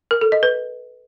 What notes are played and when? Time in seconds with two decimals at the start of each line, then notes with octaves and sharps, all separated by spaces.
0.11 A#4
0.21 A4
0.32 D#5
0.43 B4